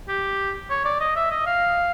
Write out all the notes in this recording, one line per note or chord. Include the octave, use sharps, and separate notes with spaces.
G4
C#5
D5
D#5
E5
D#5
F5